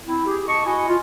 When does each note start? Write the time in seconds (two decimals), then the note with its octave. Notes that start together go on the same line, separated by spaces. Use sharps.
0.07 C4 E4
0.26 G4 G#4
0.48 D#5 A5 C#6
0.66 E4 F#4 D#5 G#5
0.89 F4